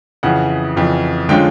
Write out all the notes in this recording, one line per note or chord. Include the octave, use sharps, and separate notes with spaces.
F2 C#3 E3 F#5
F2 C#3 E3
D3 F3 G#3 C#4 F4 G5